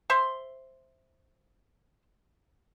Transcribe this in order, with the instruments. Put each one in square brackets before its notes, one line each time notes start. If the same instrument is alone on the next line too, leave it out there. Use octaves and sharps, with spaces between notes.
[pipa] C5 E5 C6